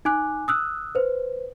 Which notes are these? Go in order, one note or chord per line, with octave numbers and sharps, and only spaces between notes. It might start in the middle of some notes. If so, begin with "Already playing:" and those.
D#4 G#5 D6 F#6
D#6 E6 F#6
B4 C5